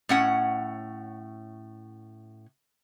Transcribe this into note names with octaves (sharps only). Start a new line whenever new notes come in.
A2 C#4 F#5